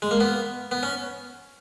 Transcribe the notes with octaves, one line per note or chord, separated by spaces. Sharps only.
G#3
A#3
B3
B3
C#4